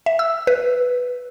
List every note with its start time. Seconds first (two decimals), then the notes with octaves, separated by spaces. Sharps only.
0.06 E5
0.19 E6
0.47 B4